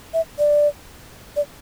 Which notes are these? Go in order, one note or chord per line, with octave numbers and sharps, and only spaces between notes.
E5
D5
D5